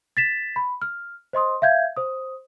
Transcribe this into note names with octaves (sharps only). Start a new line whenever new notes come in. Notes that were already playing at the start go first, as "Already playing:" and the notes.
A6 B6 E7
B5
F6
C5 D#5 C6 D#6
E5 F5 G6 G#6
C5 D#6